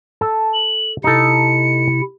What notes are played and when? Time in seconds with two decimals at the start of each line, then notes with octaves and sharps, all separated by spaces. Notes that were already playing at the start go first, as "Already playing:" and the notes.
0.21 A4 A5
0.54 F#7
1.04 C3 D#4 E4 A4 C#7